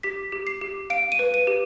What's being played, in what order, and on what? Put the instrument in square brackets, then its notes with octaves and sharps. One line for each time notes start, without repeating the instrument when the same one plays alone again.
[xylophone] G4 B6
G4
C7
G4
F5 D7
D#7
B4
D#7
G4